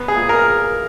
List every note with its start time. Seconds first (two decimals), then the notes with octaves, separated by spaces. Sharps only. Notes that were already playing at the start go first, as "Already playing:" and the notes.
Already playing: B3
0.08 G#4
0.16 A#2
0.29 A#4